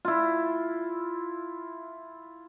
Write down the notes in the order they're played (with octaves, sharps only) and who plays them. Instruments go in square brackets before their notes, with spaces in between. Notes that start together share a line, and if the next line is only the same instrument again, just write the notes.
[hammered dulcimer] E4 F4